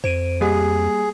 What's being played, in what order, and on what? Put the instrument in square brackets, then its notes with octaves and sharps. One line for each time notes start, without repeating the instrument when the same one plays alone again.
[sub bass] F2 [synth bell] C5 D7 D#7
[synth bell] G3 A#3 G4 [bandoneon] G#4